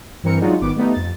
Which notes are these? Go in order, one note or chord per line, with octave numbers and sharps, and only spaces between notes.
G2 E3 C4 A#4 C#7
F#3 G#3 D4 D#4 F4 F#4
G#1 D#3 B3 D6
G3 A3 B3 D#4
F2 A6